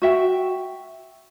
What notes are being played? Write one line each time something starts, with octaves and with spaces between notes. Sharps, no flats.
F#4 E5 G5